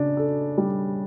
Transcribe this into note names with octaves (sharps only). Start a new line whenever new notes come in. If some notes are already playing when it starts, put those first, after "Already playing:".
Already playing: C#3 D4
A4
G3